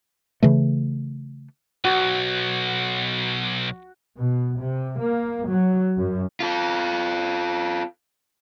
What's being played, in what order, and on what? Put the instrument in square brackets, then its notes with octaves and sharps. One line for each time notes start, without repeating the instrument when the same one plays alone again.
[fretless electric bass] C#3 E3 A3
[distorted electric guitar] B1 [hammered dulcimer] F#4
[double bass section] B2
C3
A#3
F#3
F#2
[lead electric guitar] F4 A4